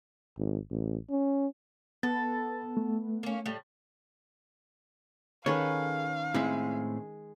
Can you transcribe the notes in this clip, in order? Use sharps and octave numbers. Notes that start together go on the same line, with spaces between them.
G#1
A1
C#4
B3 A4 A6
A3
A#3 C#4
A2 G3
D#3 C#4 G#4 A4 B4 C#5 F5
A2 G#3 C4 E4